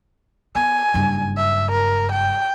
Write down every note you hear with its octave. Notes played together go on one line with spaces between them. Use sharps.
B3 G#5
F#1 G2
E5
A#4
G5